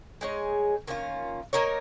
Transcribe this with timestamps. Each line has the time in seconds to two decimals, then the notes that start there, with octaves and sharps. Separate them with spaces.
0.21 G#3 D#4 G#4 C#5
0.87 D#3 A#3 C#4 F4
1.53 A#3 D#4 A#4 C#5